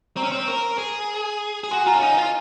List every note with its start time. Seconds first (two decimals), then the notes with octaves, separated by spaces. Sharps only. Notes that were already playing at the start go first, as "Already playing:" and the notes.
0.17 C4 A#5 C#6
0.23 C#4
0.32 C4
0.48 A#4 A#5 C#6
0.78 G#4
1.64 G#4
1.71 F#4 G#5 C6
1.82 G#5
1.87 F4 F#5 A#5
1.95 C#4
2.02 D#4 F5 G#5
2.13 C#5
2.17 F4 C5 D#5